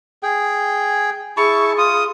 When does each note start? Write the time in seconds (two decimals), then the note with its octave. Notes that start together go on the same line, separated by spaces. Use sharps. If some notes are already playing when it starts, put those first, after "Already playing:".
0.23 G#4 G5
1.37 E4 G#4 A5 C#6
1.77 F4 D#6